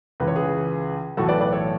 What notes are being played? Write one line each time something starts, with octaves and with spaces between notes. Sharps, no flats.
C#2 C#3 E3 B4
C#5
G#4 B4
B1 A2 E3 F#4 A4
B4 D5
B4 D5
A4 C#5